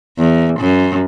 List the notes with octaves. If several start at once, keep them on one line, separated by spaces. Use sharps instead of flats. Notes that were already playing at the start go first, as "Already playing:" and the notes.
E2
F#2